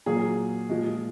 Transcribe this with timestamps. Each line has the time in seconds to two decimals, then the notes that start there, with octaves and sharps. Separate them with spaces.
0.06 A#2 F#3 A#3 G#4
0.69 A#2 F3 G#3